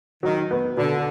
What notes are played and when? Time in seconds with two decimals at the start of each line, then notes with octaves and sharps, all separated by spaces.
0.23 D#3 F#3
0.51 B3
0.77 B2 D3